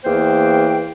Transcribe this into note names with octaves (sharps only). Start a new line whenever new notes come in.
E2 A#3 C5 G5